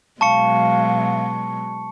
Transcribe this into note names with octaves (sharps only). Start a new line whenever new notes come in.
B2 F#3 G#3 F5 A5 C#6 C#7